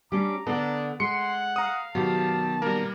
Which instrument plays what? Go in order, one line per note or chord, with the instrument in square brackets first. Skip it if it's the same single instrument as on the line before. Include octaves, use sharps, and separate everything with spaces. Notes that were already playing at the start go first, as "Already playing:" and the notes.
[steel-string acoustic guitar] G3 C#4 D4 [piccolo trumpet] A#5 [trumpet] D6
[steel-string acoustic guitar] D3 A4 [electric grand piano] B3 [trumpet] D4
[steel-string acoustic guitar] G#3 [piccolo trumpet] F#5 [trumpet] C6 [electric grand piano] C#7
[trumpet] F5 [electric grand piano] A#5 D#6
[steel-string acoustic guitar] B2 D#3 [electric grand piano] F#3 G4 [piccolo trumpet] A5
[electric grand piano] G3 A#3 [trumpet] A#4